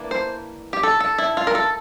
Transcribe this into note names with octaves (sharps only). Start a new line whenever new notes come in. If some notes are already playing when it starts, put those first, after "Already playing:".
Already playing: E3 A#3 D4
C5
G4
A4
A4
E4
F4
A#4
A4